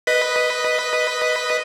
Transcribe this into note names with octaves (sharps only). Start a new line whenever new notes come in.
B4 D#5 B6